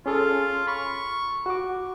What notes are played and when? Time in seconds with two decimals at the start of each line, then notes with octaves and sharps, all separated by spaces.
0.06 C#4 F4 G#4 A4
0.68 B5 C#6
1.46 F#4 D6